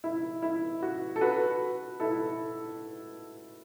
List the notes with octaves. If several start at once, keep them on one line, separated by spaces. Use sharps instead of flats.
E4
E4
F#4
A4
F#4 B4
E4 A4